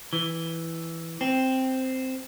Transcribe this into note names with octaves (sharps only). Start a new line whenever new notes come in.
E3
C4